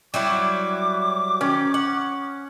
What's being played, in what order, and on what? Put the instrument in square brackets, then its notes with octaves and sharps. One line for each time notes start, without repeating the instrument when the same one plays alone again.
[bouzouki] F#3 G3 E4 [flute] D6
[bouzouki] D#3 [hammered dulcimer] C#4
[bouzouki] F#5